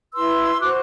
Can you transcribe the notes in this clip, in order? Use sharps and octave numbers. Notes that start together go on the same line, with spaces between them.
E4 B4 C6 E6
F#4 C5 D6 F#6